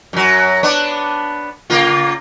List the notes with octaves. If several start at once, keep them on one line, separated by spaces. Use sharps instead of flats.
F#2 F#3
B3 D4
C#3 A#3 F4